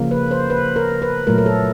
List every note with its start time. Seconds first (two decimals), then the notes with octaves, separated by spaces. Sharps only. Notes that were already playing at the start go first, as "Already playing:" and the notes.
Already playing: C#3 F3 A#3
0.11 B4
0.31 C5
0.50 B4
0.76 A#4
1.02 B4
1.27 A#2 F#3 A3 A#4
1.38 A#4
1.46 A4